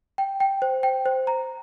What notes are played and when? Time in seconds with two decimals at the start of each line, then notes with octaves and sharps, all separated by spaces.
0.18 G5
0.40 G5
0.62 C5
0.83 G5
1.06 C5
1.27 A#5